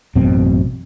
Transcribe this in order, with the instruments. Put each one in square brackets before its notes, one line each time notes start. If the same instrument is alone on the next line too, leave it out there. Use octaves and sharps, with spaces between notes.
[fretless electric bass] A1 F#2 B2 C4